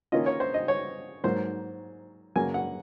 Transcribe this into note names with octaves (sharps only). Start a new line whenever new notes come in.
D#3 A#3 C#4 F4 D#5
C#5
C5
D#5
C#5
G#2 F#3 A#3 C5
F#2 C#3 F#3 A#3 G#5
F#5